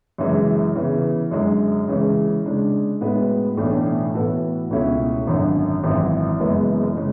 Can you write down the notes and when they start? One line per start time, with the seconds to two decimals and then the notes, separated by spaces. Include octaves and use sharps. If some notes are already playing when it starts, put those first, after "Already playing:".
0.18 F#2 C#3 E3 G#3
0.75 C#3 E3 B3
1.31 F#2 D3 G#3
1.88 C#3 E3 G#3 C#4
2.44 C#3 G#3 D4
3.01 A2 G#3 B3 F#4 B4
3.57 B1 A2 E3 A3 D4
4.14 A2 E3 B3 F#4 A4
4.70 C#2 B2 A3 C#4 E4
5.27 G#1 F#2 D3
5.84 G#1 F#2 E3
6.40 F#1 F#2 E3 G#3 B3
6.96 C#3 G#3